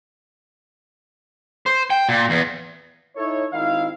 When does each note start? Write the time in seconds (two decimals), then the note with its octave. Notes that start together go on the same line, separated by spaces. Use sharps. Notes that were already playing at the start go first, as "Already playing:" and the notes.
1.66 C5
1.90 G5
2.09 A#2
2.30 E2
3.17 D#4 E4 A4 C#5
3.53 G#1 D#3 E4 F5